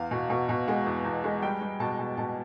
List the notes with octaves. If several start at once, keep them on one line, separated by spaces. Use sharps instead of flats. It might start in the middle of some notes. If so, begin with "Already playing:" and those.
Already playing: E2 F5
B2
B2
B2
G#3 F#5
E2
E2
G#3
G3 G5
G3
B2 A5
B2
B2 A5